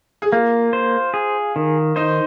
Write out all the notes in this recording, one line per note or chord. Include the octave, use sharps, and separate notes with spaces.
G#4
A#3 F4
C5
G#4
D#3
D#4 C5